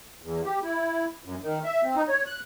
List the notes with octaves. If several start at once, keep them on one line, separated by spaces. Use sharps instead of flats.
E2
G4
E4
F#2
D#3
E5
C4
D#4
C#5
F#6